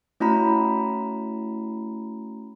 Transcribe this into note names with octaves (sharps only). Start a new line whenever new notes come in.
A3 C#4 E4 F#4 A#5 B5